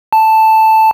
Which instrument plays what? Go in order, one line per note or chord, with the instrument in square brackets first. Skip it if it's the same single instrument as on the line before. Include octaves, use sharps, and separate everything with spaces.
[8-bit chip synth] A5